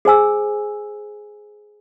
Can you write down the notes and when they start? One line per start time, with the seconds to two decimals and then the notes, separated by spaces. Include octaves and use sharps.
0.05 G#4 C5 G#5 E6